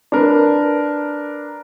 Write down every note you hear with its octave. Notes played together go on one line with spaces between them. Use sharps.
D4 A#4 B4